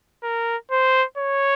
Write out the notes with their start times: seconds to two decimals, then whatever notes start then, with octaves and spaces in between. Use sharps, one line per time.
0.24 A#4
0.72 C5
1.18 C#5